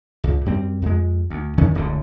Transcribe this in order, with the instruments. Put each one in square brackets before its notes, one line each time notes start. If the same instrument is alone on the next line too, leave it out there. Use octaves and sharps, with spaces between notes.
[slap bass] C#2
F#2 G3 C4
F2 G#3
D2
E2 D#3 F3 C#4
D1 C#2 F#2 D3